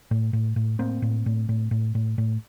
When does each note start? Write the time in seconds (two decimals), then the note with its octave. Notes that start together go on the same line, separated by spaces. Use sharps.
0.11 A2
0.33 A2
0.56 A2
0.79 A2 A#3 C4
1.02 A2
1.26 A2
1.49 A2
1.71 A2
1.95 A2
2.18 A2